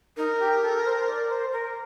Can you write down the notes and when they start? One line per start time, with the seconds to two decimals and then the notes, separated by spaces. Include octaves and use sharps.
0.17 D#4 A#4
0.39 G4
0.63 A4
0.85 C5
1.08 D5
1.29 C5
1.52 A#4